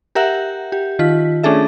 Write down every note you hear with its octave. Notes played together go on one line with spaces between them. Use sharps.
G4 A#4 E5 F#5
G4
D#3 F4 B6
A3 C#4 D4 G#4 A4 E5